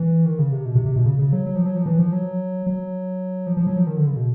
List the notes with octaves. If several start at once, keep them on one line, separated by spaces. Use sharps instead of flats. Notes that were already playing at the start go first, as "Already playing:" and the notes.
Already playing: E3
D#3
C#3
C3
B2
C3
C3
B2
C#3
C#3
F#3
F#3
F3
F#3
F3
E3
F3
F#3
F#3
F3
F3
F#3
F3
D#3
D3
C#3
B2